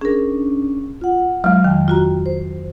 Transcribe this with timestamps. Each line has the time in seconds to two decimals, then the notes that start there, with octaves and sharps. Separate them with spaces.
0.01 C#4 D4 G#4 A#4
1.01 F4 F#5
1.44 F#3 G#3
1.64 F2 D#3 G5
1.88 F4 F#4 A#5
2.26 C5